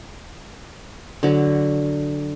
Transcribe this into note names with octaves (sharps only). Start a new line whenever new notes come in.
D3 F#3